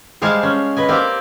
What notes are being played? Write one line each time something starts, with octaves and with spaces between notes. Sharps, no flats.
G3 G#3 C5 F5 G#5 A5
C#4
B4 D#5 G#5
A#3 C4 G4 A#4 D5